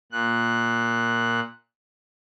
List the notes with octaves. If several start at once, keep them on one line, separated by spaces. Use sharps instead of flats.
A#2 F#6